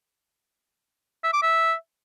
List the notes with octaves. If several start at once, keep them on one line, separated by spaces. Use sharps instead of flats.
E5
D6
E5